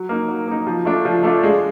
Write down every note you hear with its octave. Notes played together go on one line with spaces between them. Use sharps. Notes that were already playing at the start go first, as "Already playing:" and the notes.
Already playing: F#3
A#3 D#4
F#3
A#3 D#4
F3
A3 D4 F4
F3
A3 D4 F4
G#3